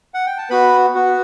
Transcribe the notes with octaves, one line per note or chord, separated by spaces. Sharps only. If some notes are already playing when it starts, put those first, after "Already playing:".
F#5
G5
A5
B3 F#4 B4 B5
B3 F#4